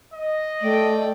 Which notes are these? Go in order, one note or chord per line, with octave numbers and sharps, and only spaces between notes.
D#5
A3 D5 G5